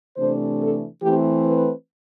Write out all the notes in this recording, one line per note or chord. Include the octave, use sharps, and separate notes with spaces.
C3 E3 A3 D4 C5
A4
E3 A3 C4 G4
B4